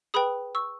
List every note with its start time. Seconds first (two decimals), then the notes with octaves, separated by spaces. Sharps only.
0.14 G#4 B4 G5 B5 D#6
0.55 C#6 E6